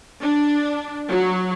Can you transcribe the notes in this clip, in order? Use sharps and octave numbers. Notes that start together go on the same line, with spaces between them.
D4
F#3